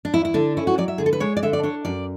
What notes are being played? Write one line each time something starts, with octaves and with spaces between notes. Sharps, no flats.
D4
E2 E4
E4
D3 D4
C#4 E4
F#4
F#3 D5
E5
D3 G#4
A4
B4
G#3 C#5
D5
D3 E5
D5
D4 C#5
F#2 D5